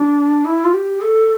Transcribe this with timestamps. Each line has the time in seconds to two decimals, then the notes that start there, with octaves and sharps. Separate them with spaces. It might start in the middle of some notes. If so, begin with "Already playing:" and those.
Already playing: D4
0.45 E4
0.64 F4
0.73 G4
1.01 A4